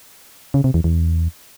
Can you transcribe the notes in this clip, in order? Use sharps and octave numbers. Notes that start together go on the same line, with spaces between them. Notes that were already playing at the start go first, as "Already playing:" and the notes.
C#3
C3
E2
E2